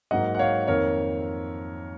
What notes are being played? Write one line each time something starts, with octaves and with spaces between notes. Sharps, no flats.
G#2 F#3 A#3 D#5 F#5
F#5
C#5 F5
F2 D#3 A#3 A#4 C#5